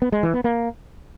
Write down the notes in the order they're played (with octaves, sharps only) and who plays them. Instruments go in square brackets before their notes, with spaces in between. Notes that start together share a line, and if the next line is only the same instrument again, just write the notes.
[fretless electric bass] B3
G#3
E3
B3
A#3